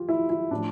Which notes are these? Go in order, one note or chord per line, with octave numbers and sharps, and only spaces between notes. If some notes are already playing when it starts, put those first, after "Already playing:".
Already playing: F3 F4 G4
E4
E4
A2 F3 D4